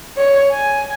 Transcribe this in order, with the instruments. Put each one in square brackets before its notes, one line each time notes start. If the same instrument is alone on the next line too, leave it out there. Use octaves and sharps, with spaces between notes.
[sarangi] C#5
G#5